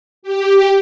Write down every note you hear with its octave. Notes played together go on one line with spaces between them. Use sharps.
G4